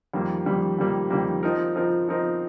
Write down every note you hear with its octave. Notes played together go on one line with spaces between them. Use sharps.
F2 D#3 G3 A#3
F2 D#3 G3 A#3
F2 D#3 G3 A#3
F2 D#3 G3 A#3
F3 C4 D#4 A#4
F3 C4 D#4 A#4
F3 C4 D#4 A#4